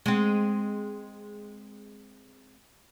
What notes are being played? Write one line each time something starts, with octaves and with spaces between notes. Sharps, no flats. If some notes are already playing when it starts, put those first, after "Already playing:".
G#3 C4